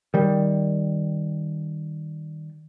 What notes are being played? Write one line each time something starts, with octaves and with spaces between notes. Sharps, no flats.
D#3 G3